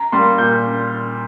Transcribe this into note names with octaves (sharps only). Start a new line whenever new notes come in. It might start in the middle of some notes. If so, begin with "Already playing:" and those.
Already playing: A#5
G3 A#3 C6
A#2 G6